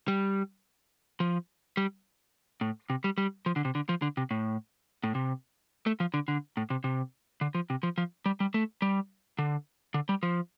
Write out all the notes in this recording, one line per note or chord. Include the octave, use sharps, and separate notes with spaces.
G3
F3
G3
A2
C3
G3
G3
F3
D3
C3
D3
F3
D3
C3
A2
A2
C3
A3
F3
D3
D3
A2
C3
C3
D3
F3
C3
F3
F3
G3
G3
A3
G3
D3
D3
G3
F3